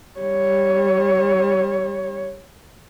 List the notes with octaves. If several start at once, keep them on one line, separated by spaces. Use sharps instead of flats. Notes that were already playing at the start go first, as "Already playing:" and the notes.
G3 C#5